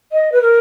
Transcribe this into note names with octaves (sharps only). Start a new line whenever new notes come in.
D#5
B4
A#4